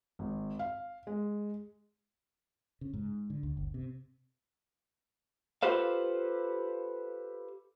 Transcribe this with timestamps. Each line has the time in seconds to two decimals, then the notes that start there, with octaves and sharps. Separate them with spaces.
0.19 G#1
0.59 F5
1.07 G#3
2.81 C#3
2.94 G#2
3.30 D3
3.43 D2
3.57 G1
3.74 C3
5.63 F4 G4 A4 B4 C5 F5